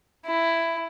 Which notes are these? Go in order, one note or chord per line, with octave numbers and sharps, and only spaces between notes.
E4